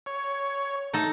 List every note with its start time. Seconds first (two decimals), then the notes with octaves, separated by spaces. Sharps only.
0.06 C#5
0.93 A3 D#4 A4